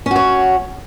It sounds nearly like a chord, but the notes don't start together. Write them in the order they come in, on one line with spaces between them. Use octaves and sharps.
C#4 F#4 C#5